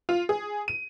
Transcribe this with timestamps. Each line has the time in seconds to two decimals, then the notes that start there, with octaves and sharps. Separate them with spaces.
0.09 F4
0.29 G#4
0.68 D#7